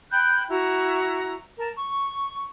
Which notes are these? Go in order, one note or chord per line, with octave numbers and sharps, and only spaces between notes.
G5 B5 F#6 G6
E4 F#4 A#5
A#4 A5
C#6